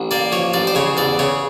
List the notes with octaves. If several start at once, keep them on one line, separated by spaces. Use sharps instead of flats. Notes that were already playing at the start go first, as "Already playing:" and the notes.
Already playing: A1
A#3 D5
F3 C#5
A1 D5
C5
C#3 C#5
E2 D5
C#3 C#5